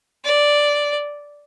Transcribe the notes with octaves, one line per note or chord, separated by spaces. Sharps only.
D5